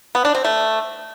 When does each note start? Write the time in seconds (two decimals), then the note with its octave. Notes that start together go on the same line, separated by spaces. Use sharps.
0.15 B3
0.25 D4
0.35 C4
0.45 A3